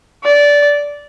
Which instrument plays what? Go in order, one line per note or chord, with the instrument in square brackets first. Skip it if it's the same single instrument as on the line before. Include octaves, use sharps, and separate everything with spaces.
[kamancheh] D5